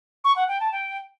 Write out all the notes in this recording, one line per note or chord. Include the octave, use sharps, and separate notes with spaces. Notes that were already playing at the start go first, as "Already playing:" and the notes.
C#6
F#5
G5
A5
G5